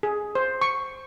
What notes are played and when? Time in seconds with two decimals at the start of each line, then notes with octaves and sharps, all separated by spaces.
0.03 G#4
0.35 C5
0.61 C#6